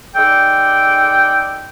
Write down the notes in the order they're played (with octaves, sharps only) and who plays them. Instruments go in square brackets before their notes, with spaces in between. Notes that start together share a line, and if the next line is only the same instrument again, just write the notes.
[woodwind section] G#3 D#4 A4 D5 G5